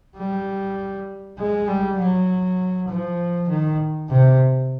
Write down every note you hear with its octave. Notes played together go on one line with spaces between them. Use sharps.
G3
G#3
G3
F#3
F3
D#3
C3